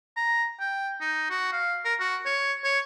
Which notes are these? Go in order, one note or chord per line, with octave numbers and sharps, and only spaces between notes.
A#5
G5
D#4
F#4
F5
A#4
F#4
C#5
C#5